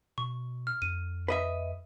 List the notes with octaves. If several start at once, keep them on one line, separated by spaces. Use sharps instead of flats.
B2 C#6
F6
F2 D#7
B4 D#5 E5